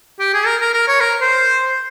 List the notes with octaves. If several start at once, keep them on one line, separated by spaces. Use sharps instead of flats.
G4
G#4
A#4
A#4
A#4
C#5
A#4
C5